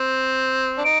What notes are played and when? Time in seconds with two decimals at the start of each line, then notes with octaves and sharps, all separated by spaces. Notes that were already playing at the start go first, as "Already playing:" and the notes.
Already playing: C4
0.78 D4
0.84 D#4 D7